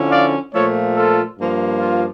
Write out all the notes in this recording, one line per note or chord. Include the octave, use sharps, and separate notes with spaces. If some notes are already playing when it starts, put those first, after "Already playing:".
Already playing: D3 F3 C#4 E4
D5 F5
A#2 F3 A3 A4 C#5
F4 A4
G2 F3 A#3
F4